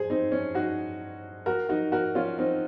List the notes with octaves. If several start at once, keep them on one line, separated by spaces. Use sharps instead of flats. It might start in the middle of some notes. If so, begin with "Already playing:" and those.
Already playing: G#4 C5
C4 D#4
C#4
D#4 F#4
F#4 A#4
D#4 F#4
F#4 A#4
C#4 F4
C4 D#4